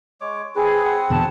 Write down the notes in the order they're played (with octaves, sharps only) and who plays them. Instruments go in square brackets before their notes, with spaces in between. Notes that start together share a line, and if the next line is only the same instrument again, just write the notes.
[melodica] G#3 C#5 D6
[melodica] C4 E4 B4 [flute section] G#4
[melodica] C4 F#5
[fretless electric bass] E2 B2 D3 [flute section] A5